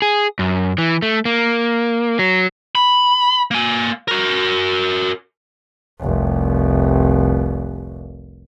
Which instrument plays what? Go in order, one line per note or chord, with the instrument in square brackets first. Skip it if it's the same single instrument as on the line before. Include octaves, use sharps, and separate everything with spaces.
[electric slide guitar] G#4
F#2
E3
A3
A#3
F#3
[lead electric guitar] B5
A#3 G#5
F#4 A#4
[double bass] F1 C2